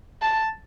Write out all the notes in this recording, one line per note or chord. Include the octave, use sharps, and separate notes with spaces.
A5